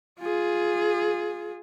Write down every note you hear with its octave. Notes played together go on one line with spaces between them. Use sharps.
F4 G#4